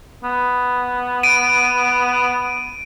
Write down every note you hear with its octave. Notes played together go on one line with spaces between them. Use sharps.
B3
D7 D#7